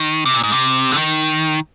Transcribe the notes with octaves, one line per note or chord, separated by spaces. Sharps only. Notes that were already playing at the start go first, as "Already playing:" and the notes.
Already playing: D#3
C3
A#2
G#2
C3
D3
D#3